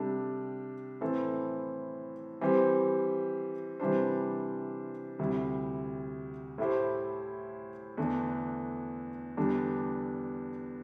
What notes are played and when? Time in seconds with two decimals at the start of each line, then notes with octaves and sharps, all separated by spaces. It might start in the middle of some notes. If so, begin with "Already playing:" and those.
Already playing: C3 G3 D4 A4
1.01 A2 E3 C4 A4
2.41 E3 G3 C4 G4 C5
3.80 C3 E3 G3 D4 C5
5.19 D2 C3 G3 E4
6.58 A2 A3 E4 G4 C5
7.97 E2 D3 A3 D4
9.37 E2 D3 G3 D4